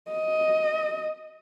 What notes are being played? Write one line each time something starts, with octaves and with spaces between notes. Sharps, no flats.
D#5